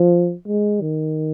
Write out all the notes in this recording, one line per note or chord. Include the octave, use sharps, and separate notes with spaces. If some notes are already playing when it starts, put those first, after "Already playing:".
Already playing: F3
G#3
D#3